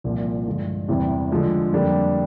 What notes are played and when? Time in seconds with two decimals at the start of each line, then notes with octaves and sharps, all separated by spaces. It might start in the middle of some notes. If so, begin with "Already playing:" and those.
0.04 C2 A#2 F3
0.47 G2 D3 F3 G#3
0.88 E2 C3 E3 G3 C4
1.31 D3 F3 G#3
1.72 F2 D3 G3 A#3 D4